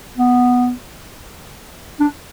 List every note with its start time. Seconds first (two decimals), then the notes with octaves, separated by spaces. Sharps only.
0.17 B3
2.00 D4